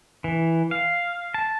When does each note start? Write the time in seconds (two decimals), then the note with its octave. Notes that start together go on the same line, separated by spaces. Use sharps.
0.24 E3
0.71 F5
1.34 A5